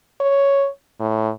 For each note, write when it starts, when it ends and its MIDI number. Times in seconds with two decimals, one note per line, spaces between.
0.20 0.68 73
1.00 1.30 45